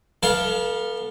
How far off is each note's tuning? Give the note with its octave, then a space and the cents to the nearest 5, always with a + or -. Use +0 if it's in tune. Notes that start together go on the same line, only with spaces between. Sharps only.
B3 -35 A4 +0 F5 +0